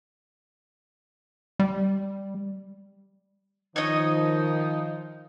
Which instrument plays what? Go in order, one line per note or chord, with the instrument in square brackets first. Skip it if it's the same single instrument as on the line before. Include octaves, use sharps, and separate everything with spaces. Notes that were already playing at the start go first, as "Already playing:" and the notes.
[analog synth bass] G3
[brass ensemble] D#3 [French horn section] F3 [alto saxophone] D#4 [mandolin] C#5 D#5